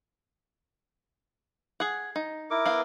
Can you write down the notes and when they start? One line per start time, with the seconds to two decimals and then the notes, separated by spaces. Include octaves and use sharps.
1.80 G#4 F#5
2.16 D#4
2.51 E4 A#4 D6
2.66 B3 F5